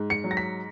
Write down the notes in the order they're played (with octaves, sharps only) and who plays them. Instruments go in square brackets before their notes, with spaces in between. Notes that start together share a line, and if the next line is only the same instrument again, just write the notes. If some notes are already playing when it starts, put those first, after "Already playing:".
Already playing: [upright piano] G#2
C#7
F#3
A#6
B6